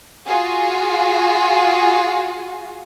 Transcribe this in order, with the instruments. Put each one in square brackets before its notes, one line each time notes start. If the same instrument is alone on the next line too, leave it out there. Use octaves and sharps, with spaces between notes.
[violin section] F4 F#4 G#4